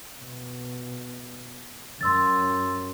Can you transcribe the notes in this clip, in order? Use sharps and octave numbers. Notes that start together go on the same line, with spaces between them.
B2
F#2 C6 E6 A6